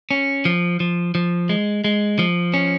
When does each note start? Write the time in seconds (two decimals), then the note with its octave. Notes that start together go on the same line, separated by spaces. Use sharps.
0.11 C#4
0.45 F3
0.80 F3
1.15 F3
1.49 G#3
1.84 G#3
2.19 F3
2.54 C#4